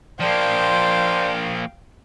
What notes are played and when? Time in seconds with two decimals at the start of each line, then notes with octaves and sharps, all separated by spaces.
0.20 F3 A#3 C5 D5 F5 G5 A5 C6